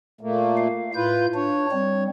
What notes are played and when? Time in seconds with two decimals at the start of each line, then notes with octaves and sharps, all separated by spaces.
0.21 A#2 A3 A#3
0.57 F5
0.94 A2 F4 B4 G6
1.34 D4 C#5
1.72 G3 C4